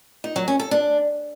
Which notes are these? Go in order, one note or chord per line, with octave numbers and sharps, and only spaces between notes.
D#4
F#3
C#4
A4
D4